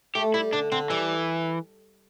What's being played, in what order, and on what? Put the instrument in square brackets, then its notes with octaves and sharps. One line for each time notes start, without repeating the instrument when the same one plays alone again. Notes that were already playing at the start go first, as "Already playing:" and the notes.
[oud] A3 [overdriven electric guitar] G4
[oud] G3 [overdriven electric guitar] E4
[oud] D3 [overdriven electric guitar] D4
[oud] D3 [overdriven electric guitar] C4
[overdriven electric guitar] E3 [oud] G3